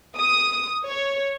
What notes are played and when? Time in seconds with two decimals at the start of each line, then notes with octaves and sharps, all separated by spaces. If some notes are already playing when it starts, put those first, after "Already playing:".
0.18 D#6
0.85 C#5